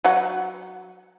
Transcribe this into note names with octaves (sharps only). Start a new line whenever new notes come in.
F#3 F#5